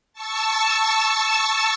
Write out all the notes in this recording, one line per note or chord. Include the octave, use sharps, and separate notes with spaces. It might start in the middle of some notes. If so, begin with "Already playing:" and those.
A5 C#6 E6